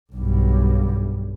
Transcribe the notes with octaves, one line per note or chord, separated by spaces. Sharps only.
B1 G2